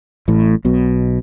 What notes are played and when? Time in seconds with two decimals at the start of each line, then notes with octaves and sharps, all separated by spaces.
0.28 A1 A2
0.65 B1 B2